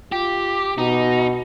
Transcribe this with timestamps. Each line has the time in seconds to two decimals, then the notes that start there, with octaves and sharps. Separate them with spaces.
0.12 F4 G4
0.78 B2 D#4